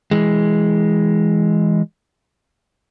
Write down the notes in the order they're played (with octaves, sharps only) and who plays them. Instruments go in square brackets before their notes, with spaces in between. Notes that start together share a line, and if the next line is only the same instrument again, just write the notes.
[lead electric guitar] E3 G#3